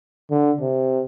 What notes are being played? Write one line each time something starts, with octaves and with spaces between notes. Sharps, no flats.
D3
C3